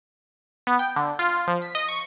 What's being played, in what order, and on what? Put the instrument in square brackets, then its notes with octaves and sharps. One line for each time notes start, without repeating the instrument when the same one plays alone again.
[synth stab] B3
G5
D3
F4
F3
B6
D#5
C#6